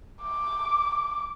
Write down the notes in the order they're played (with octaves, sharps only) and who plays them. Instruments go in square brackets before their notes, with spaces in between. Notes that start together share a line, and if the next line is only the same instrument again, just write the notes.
[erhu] D6